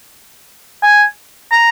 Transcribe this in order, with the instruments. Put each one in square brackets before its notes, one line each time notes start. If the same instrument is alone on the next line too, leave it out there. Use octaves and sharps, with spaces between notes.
[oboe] G#5
A#5